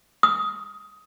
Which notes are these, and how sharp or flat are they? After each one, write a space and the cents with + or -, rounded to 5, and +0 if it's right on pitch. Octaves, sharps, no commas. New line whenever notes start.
D#6 +15